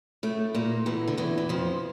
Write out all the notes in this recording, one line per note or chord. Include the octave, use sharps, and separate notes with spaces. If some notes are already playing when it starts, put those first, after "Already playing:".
A2 A3
A#2 A#3
E2 E3
D3
E2 E3
E3
F2 F3